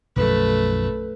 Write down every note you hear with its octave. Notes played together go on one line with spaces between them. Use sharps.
B1 F#2 F3 A3 B4